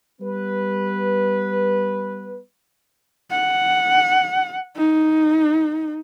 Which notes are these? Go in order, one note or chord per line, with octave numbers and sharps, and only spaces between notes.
G3 B3 B4
F#5
D#4